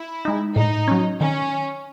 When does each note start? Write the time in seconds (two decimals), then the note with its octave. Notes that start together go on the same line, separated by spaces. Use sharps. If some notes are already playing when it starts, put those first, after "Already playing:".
Already playing: E4
0.25 G#3 D#4
0.56 A2 D#4
0.88 F#3 C#4
1.20 D#3 C#4